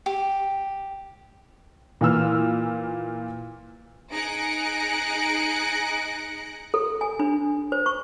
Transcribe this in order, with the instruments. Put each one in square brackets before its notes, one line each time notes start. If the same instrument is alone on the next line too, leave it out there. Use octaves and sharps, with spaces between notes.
[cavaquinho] G4
[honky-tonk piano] A#2 E3 E6 F6
[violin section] D#4 G#4 F#6 A#6 C#7 D7
[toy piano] A4
G#5
D4
C5
C#6